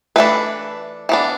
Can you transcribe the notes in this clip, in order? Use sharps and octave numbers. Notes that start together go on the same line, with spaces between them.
E3 A3 D4 B4
E3 B3 D4